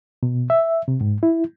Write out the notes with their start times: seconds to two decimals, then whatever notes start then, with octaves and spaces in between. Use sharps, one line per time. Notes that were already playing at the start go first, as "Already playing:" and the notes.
0.23 B2
0.50 E5
0.88 C3
1.01 G#2
1.23 E4